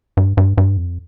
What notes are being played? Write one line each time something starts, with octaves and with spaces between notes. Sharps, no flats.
G2
G2
G2
F2